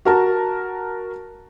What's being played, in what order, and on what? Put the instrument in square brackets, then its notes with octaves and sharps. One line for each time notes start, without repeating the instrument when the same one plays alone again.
[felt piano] F#4 A#4 A5